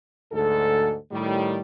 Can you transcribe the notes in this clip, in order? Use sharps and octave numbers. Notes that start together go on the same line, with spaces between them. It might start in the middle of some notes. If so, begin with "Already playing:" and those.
D2 G#2 A4
A2 D#3 G3